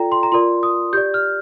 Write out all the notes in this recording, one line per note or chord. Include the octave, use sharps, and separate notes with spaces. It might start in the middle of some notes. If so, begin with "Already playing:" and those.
Already playing: F4 A4 D5 G5 A#5
C6
A#5
F4 A#4 D5 C6
D#6
G4 D5 G6
F6